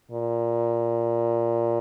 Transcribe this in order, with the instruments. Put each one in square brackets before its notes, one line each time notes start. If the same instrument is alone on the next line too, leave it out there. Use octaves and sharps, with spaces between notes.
[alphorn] A#2